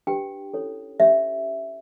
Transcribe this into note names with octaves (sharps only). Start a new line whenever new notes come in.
D4 G4 B4 G5
C#4 E4 A4 C#5
C#4 G4 C#5 E5